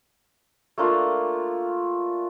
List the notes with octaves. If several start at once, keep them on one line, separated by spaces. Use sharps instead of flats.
A3 A#3 D4 F4